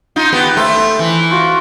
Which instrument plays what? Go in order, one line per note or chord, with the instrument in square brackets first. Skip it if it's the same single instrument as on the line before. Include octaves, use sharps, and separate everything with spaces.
[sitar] D#4 F4
B3 G4 B4
[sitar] A3 [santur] C5 E5
[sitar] E3
[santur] F4 F#4